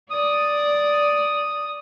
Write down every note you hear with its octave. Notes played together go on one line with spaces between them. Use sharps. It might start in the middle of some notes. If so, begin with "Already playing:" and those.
D5 D#6